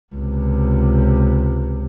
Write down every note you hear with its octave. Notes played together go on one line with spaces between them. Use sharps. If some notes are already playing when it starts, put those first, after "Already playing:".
C#2 C3